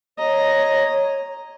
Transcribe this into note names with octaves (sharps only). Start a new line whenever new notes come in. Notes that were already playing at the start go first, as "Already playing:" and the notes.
C#5 D#5 A#5